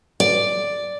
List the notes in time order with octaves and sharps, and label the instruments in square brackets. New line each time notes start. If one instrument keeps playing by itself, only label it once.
[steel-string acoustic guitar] D5